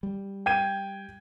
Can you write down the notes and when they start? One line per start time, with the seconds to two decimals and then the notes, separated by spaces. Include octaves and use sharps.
0.03 G3
0.46 G5 G#6 D#7